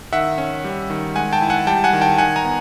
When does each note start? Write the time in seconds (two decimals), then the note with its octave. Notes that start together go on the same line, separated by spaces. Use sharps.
0.13 D#3 E5 F#5
0.38 C#4
0.64 G3
0.90 D#3
1.16 G#3 F#5 G#5
1.33 G5 A5
1.41 E4
1.50 F#5 G#5
1.67 G3 G5 A5
1.84 F#5 G#5
1.93 D#3
2.01 G5 A5
2.18 D#3 F#5 G#5
2.36 G#5 A#5
2.45 B3